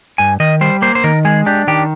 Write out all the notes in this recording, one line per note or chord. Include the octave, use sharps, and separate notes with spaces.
G2 G#5
D#3 D#5
G3 C5
A#3 C5
C5
D#3 A#4
G#3 G#4
D4 G4
D#3 G4